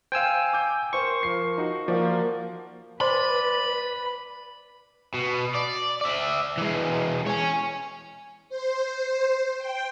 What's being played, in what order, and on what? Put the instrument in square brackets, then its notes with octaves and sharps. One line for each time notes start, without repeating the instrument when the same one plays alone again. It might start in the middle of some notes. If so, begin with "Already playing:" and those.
[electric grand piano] C5 F5 [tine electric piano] G5 G#5 E6
[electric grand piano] D6 G6
[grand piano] A#4 C5 C6 [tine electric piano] C#6
[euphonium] F3 [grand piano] A#4 C7
[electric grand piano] D#4 F#4
[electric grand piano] F3 [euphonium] A#3 [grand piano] F#4 C5 D5
[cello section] B4 [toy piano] C5 C6 [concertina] D5 [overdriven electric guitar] B5
[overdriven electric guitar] B2
D5
D5 E5
E3 G#3
C#5 G#5
[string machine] C5
G5